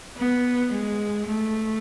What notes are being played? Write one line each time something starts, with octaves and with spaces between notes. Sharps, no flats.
B3
G#3
A3